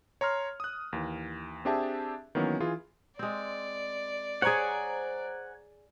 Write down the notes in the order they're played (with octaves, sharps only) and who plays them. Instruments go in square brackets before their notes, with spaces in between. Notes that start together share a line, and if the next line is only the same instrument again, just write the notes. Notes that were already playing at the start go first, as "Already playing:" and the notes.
[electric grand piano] C#5 A#5 C6 F6
D#6 F#6
D#2 E3
C4 D4 G4 G#4 E5 A5
D#3 E3 F#3 A#3 B3 C#4
E3 F4 G#4
[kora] G#3 C4 [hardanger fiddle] D5
[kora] G#4 C#5 [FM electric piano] C5 A#5 [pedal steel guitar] F#5 G#5